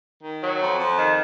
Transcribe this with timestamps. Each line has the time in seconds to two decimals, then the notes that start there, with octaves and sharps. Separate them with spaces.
0.23 D#3
0.42 F#3
0.60 F2
0.78 F2
0.98 D#3